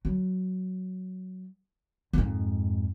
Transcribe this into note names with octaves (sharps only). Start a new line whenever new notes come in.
F#3
F2 G#2